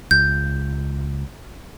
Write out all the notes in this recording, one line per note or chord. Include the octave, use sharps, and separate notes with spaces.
C#2 G6